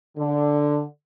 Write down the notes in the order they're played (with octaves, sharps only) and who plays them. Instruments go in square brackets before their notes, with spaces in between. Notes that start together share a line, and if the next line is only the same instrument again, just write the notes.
[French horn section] D3